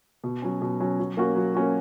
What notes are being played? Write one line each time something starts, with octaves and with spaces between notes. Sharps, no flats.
B2
F#3 C#4
B2
F#3 C#4
F#3
A#3 C#4 F#4
F#3
A#3 C#4 F#4